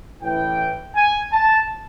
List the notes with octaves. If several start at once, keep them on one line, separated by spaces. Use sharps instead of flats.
A1 A2 E3 G5
G#5
A5